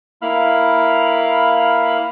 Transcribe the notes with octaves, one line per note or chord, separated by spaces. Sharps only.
A#3 E4 F5 B5 F6